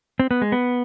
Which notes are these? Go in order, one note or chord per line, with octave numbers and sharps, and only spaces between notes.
C4
B3
G#3
B3